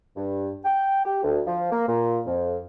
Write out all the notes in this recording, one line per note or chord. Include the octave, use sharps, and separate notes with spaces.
G2
G5
G4
D2
F3
A#3
A#2
F2